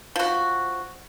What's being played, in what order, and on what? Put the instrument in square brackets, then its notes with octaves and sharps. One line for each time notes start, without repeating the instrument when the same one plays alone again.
[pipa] F3 F#4